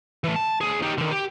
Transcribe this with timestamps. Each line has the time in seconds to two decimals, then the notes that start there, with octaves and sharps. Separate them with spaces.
0.24 E3 A3
0.36 A5
0.61 D2 G#4
0.82 D#4 G4
0.98 D3 D#3
1.11 G4